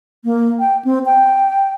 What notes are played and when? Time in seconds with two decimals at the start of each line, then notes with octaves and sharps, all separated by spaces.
0.24 A#3
0.60 G5
0.85 C4
1.06 G5